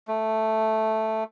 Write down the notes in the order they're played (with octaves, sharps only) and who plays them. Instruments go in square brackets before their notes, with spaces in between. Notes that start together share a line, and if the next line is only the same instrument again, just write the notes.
[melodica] A3